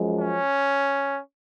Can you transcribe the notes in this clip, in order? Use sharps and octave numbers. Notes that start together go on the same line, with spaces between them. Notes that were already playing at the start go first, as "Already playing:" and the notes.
Already playing: F#2 F3 G#3
C#4